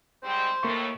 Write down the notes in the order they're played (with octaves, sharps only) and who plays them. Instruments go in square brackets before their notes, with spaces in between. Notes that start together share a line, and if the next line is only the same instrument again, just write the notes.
[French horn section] G#2 G3 C4 [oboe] C5
[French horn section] D#2 A2 A3 [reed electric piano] A#3 C#6